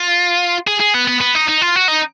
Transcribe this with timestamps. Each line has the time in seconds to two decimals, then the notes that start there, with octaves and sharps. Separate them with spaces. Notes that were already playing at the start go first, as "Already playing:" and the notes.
Already playing: F4
0.67 G#4
0.80 G#4
0.94 B3
1.08 B3
1.21 B3
1.35 D#4
1.48 D#4
1.61 F4
1.75 F#4
1.88 D#4